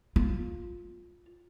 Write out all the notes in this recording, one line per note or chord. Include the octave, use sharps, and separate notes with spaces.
F4